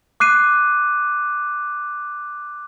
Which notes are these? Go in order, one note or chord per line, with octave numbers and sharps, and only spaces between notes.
D6 F#6 C7 D#7